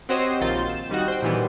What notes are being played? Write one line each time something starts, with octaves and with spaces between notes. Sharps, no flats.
C4 F#4 G4 C5 C#5 D#5
A#1 D#3 C4 F4 G6 A6
E7
D#3 G3 D#4 F#4
C5 G5
A#2 D#3 E3 G3 B3